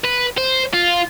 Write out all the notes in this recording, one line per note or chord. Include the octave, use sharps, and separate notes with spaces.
B4
C5
F4